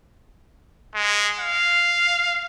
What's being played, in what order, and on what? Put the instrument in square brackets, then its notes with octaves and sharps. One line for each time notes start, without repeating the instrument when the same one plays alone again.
[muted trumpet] G#3
F5